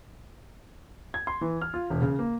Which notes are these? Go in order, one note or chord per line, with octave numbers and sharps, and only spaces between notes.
G#6
C6
E3
F6
F4
E1
C#3
A#3